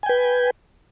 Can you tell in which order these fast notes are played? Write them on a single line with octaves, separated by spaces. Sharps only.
G#5 G5 B4